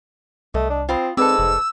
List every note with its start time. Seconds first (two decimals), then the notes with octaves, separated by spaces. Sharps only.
0.54 C2 A3 D#5
0.70 D4
0.89 C4 F4 B5 D#6
1.17 G#2 C4 A4 B4 D5 E6
1.39 F1